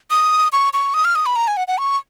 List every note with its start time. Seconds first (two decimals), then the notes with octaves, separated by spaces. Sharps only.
0.10 D#6
0.52 C#6
0.73 C#6
0.94 D#6
1.05 F6
1.15 D#6
1.26 B5
1.36 A#5
1.48 G#5
1.57 F#5
1.68 F#5
1.78 C#6